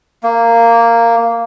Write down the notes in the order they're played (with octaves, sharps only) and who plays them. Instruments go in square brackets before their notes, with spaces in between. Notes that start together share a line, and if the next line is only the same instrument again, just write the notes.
[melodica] A#3